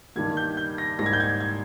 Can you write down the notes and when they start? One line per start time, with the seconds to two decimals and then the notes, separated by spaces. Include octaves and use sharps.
0.16 G2 D#3 G3 A#3 G#6
0.37 G6
0.57 G6
0.78 A#6
0.98 G#2 G3 A#3 A#6
1.06 G#6
1.13 G6
1.20 G#6
1.40 G#6